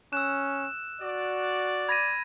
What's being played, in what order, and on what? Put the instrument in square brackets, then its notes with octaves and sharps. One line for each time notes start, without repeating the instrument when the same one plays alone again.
[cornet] C#4 [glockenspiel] E6 F#6 [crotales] E7
[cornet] F#4 [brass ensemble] D5
[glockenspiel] B5 [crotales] G#6 A#6 D#7